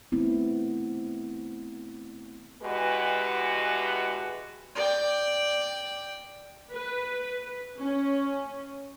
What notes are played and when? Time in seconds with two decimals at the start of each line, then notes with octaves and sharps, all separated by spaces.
0.12 A3 B3 C4 E4
2.62 E2 B2 G#3 F#4 G4 B4
4.75 D5 G5
6.72 B4
7.80 C#4